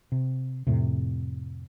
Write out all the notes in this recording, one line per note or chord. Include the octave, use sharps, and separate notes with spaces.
C3
F2 A2 C3